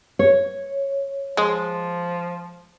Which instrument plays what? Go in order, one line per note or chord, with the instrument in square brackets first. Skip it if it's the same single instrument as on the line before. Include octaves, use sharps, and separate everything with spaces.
[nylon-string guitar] C#5
[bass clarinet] F3 [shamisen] G#3